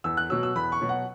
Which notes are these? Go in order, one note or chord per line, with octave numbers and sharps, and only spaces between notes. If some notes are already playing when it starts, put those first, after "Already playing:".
E2 E6
F#6
B2 F#3 E6
E6
E2 B5
C#6
B2 F#3
F#5